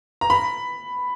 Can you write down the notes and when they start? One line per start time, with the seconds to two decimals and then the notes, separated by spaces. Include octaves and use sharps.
0.21 A#5
0.30 B5